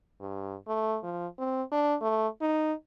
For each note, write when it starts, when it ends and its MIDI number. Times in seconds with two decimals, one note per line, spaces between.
0.20 0.56 43
0.68 0.98 57
1.03 1.27 53
1.39 1.63 60
1.72 1.96 62
2.01 2.27 57
2.41 2.73 63